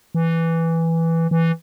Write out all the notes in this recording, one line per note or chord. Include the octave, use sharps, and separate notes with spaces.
E3
E3